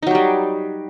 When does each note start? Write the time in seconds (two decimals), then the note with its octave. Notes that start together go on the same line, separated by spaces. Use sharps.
0.03 D#4
0.07 F#3
0.11 G4
0.15 G3